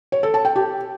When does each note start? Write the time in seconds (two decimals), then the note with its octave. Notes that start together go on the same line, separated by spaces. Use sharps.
0.12 C#5
0.23 A4
0.34 A5
0.45 G5
0.56 G4